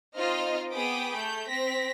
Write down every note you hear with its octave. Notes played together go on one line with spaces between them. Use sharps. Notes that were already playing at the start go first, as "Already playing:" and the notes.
C4 D#4 F4 C5 D#5 F6
B3 G#4 G5 B5 D6 D#6
A3 G6
C4 A#6 B6